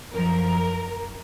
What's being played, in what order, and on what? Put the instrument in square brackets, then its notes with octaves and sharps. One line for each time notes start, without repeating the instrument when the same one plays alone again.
[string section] F#2 F3 A#4